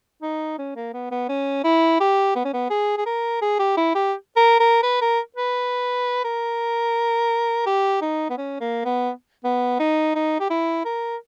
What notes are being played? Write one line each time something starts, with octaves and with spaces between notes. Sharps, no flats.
D#4
C#4
A#3
B3
B3
C#4
E4
G4
B3
C#4
B3
G#4
G#4
A#4
G#4
G4
E4
G4
A#4
A#4
B4
A#4
B4
A#4
G4
D#4
B3
C#4
A#3
B3
B3
D#4
D#4
G4
E4
A#4